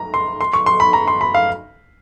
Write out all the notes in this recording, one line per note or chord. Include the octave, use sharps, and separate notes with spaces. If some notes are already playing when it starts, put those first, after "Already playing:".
Already playing: A#5
C6
C6
C#6
C6
B5
A#5
C6
B5
F5